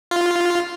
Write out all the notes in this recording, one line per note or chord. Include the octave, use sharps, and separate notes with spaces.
F4